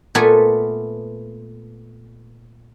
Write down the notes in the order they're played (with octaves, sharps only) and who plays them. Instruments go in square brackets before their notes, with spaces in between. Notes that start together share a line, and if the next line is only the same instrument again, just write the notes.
[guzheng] A#2 A3 B3 A#4 G#5